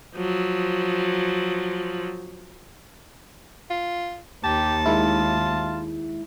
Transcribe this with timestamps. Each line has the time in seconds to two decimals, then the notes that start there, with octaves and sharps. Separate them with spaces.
0.16 F3 F#3
3.70 F4
4.44 D#2 G4 A5
4.86 D#3 G#3 E4 F4